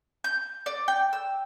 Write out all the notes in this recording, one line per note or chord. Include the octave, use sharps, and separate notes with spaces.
G6
D5
G5
E6